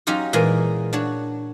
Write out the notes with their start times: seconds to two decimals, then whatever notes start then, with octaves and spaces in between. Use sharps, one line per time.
0.07 F#3 C#4 D#4 F4 G4
0.33 A#2 E3 G#3 G#4 A#4 G#5
0.93 D4 F#4 C#5